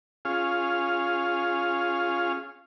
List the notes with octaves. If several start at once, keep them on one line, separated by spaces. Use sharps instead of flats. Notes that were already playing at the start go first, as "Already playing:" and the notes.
C#4 F4 G#4 F5